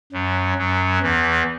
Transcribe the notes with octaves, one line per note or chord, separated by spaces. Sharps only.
F#2 F#3
F#2 F#3
E2 E3